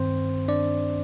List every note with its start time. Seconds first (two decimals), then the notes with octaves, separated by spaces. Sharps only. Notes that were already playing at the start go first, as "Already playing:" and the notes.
Already playing: G2 D#3 C4 C5
0.48 D4 D5